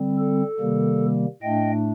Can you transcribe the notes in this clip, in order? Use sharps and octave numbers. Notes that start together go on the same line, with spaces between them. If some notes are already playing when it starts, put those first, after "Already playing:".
Already playing: D3 G3 C4
A4
C3 D#3 G3 A#3
A2 A3 D4 D#5 G5